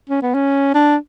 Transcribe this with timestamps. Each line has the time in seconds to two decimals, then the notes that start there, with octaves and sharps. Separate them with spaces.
0.09 C#4
0.22 B3
0.34 C#4
0.74 D4